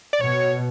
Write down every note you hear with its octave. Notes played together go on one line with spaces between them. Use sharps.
D5
B2 C#5